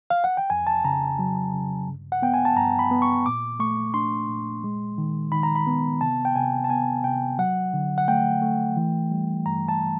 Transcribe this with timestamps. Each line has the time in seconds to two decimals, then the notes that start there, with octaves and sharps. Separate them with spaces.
0.10 F5
0.24 F#5
0.37 G5
0.50 F2 G#5
0.67 A5
0.84 C#3 A#5
1.19 F#3
1.53 C#3
1.88 G2
2.12 F#5
2.22 B3 G5
2.34 G#5
2.45 A5
2.56 G2 A#5
2.79 B5
2.91 B3
3.02 C#6
3.26 A#2 D6
3.59 A3 C#6
3.94 D4 C6
4.29 A#2
4.64 G#3
4.98 D#3
5.32 D#3 B5
5.43 A#5
5.56 B5
5.67 B3
6.01 C3 A5
6.25 G5
6.36 C3 G#5
6.64 A5
6.70 B3 G#5
7.04 C3 G5
7.38 F#3 F#5
7.74 D3
7.98 F#5
8.08 A3 G5
8.42 A3
8.77 E3
9.11 G3
9.46 G2 A#5
9.68 A5